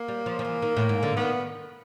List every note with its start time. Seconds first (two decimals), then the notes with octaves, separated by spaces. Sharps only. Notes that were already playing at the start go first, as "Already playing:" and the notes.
Already playing: A#3
0.08 G3
0.26 F3
0.39 F3
0.45 E3
0.62 D#3
0.77 A2
0.89 G#2
1.03 D3
1.16 D#3 B3